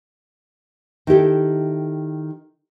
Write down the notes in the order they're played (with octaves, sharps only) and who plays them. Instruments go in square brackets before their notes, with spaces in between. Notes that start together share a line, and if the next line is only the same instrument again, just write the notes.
[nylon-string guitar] D#3 E4 G4 A4